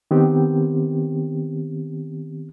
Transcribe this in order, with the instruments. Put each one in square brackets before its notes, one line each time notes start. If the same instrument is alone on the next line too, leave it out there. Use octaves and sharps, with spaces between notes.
[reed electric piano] D#3 B3 C4 G4